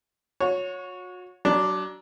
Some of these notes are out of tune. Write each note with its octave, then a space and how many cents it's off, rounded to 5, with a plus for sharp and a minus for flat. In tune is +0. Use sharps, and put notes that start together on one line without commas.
F#4 -35 C#5 +0
F#3 +30 D4 +0